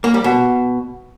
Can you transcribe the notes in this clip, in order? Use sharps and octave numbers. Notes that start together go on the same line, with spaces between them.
A#3
G3
B2